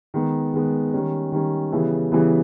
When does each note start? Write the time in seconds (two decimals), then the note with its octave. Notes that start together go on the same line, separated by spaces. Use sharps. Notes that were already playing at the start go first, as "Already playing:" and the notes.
0.14 D#3 G#3 B3
0.54 D#3 G#3 B3
0.94 D#3 G3 C#4
1.32 D#3 G3 C#4
1.72 C#3 E3 G3 B3 E4
2.12 C#3 E3 G3 B3 E4